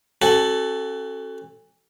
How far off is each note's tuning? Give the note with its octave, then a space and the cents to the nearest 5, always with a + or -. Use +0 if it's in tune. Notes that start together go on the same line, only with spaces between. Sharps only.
C#4 -40 F#4 +25 A4 +0